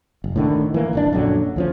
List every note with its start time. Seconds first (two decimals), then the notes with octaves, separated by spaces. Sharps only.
0.24 F#1
0.36 A2 D3 D#3
0.74 E3 A#3
0.93 D1 G1 D4
1.13 A#1 F#2 D3 F#3
1.56 D2 F3 C#4